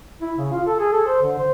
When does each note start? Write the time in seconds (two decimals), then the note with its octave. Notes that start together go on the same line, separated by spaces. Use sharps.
0.21 E4
0.37 C#3
0.52 F4
0.66 A4
0.80 G#4
0.92 A4
1.07 C5
1.22 D3
1.39 C5